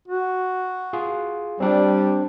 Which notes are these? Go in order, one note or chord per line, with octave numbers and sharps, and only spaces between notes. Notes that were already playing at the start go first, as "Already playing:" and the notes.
F#4
F4 G#4
G3 C4 D4